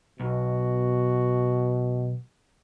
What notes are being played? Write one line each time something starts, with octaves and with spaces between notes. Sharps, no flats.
B1 B2 F#4